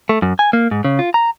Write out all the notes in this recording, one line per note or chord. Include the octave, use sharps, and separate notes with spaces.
A3
F#2
G#5
A#3
G#2
C#3
F4
A#5